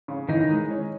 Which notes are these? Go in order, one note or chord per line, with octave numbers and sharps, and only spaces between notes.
C#3
D#3 E3 D#4
G#3
C#4